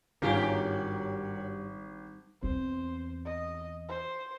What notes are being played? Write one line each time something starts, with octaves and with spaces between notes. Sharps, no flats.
G#1 G2 F#3 C#4 F4 G4 G#4 A#4
E2 C4 C5
D#5
C5